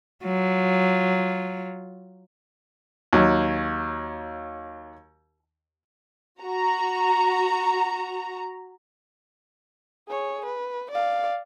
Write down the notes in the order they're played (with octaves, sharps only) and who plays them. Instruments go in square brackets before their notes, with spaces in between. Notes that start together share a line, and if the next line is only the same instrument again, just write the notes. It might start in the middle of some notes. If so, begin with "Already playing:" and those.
[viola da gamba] F#3 F4
[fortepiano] D#2 F#3
[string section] F#4 A#5
[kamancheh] G#4 C#5
B4
D5 F5